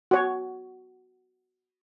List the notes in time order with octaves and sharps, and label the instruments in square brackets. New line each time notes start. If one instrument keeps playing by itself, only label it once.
[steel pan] F#4 C#5